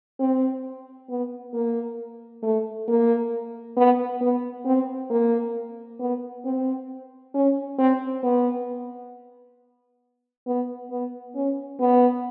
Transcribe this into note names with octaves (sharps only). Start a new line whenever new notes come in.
C4
B3
A#3
A3
A#3
B3
B3
C4
A#3
B3
C4
C#4
C4
B3
B3
B3
C#4
B3